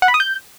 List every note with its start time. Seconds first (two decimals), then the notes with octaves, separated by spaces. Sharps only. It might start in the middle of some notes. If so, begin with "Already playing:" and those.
0.02 F#5
0.08 B5
0.14 D#6
0.20 G6